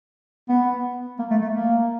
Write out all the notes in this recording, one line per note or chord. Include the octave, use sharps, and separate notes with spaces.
B3
A#3
A3
A3
A#3